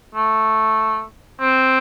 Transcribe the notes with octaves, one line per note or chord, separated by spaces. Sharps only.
A3
C4